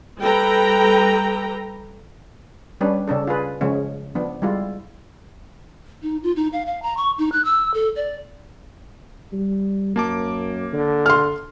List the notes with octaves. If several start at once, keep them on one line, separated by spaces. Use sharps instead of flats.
G3 A4 B4 G5 A#5
G3 C#4 D4 B4
C#3 C#4 D4 A4
F4 G#4 B4
C#3 F3 G#3 C#4
F3 B3 D4
G3 G#3 E4 F4
D#4
F4
D#4
F5
F5
A#5
C#6
D#4
F#6
E6
A4
D5
G3
F#2 A#3 A5 D6
D3
C6 F6